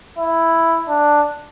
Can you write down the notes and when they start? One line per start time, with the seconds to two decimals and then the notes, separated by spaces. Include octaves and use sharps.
0.18 E4
0.89 D4